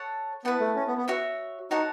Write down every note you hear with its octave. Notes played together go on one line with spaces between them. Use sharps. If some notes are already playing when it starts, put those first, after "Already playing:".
Already playing: A4 C#5 F#5 A5
B3 E4 B4 F#5 A5
A3
C#4
B3
B3
F#4 C#5 E5
D#4 F#4 C#5 F#5 A5